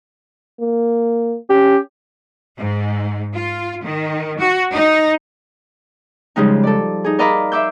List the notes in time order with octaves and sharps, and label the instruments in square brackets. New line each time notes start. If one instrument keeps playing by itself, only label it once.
[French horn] A#3
[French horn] C#4 [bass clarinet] G4
[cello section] G#2
F4
D#3
F#4
D#4
[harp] C#3 F3 G3 G#3 D#4
A4 D5
D#4 G#4
A#4 D5 D#5 F5 A#5 B5
E5 C6 D6 E6 G6